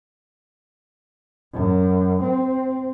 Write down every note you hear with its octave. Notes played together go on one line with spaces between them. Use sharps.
F#2
C4